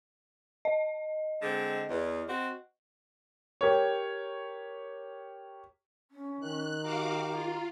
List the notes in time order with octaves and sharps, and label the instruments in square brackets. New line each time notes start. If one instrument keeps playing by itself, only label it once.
[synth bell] D#5
[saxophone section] D3 G#3 C4
E2
C4 F#4
[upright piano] G4 A#4 C#5
[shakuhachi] C#4
[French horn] D#3 [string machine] F#6
[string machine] F#4 F5 D6 [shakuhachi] G4 [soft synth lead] A#5
[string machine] F4